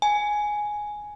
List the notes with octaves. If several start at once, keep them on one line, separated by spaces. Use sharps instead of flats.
G#5